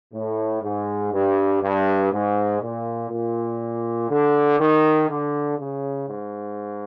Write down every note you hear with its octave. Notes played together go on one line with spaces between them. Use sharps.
A2
G#2
G2
G2
G#2
A#2
A#2
D3
D#3
D3
C#3
G#2